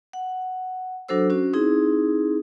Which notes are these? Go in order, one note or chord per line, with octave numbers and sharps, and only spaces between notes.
F#5
F#3 D4 F#4 A4 C5 E6
C#4 F#4
C4 D#4 E4 G#4